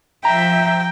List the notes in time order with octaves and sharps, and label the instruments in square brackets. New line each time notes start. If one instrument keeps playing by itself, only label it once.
[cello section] F3 E5 [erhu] G5 [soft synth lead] A#5